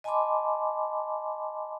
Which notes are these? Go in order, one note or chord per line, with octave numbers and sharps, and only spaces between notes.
D#5 G#5 A5 B5 C6 D6